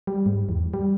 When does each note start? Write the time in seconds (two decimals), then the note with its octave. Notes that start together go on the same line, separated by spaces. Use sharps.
0.07 G3
0.26 G#2
0.49 E2
0.74 G3